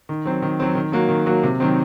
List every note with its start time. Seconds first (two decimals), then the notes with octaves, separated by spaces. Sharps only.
0.09 D#3
0.25 F#3 C4
0.42 D#3
0.60 F#3 C4
0.75 D#3
0.92 F#3 A#3 F#4
1.09 D#3
1.26 F#3 A#3 F#4
1.43 C3
1.60 D#3 F#3 C4